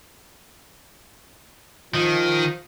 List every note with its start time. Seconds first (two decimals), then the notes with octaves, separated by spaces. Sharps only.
1.94 D#3 F3